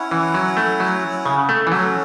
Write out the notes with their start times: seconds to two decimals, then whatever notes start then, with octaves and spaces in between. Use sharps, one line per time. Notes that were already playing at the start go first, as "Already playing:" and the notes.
Already playing: C#4 E4 C#5 F#5
0.11 E3
0.34 F#3
0.57 A3
0.80 F#3
1.26 C#3
1.49 A3
1.67 E3
1.72 F#3 C#4 A4 C#5 F#5